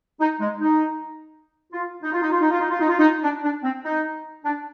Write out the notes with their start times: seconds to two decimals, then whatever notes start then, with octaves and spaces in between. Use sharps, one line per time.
0.20 D#4
0.40 G#3
0.61 D#4
1.72 F4
2.02 D#4
2.12 F4
2.22 D#4
2.31 F4
2.41 D#4
2.51 F4
2.61 D#4
2.70 F4
2.79 D#4
2.89 F4
2.99 D#4
3.23 D4
3.43 D4
3.63 C4
3.84 D#4
4.44 D4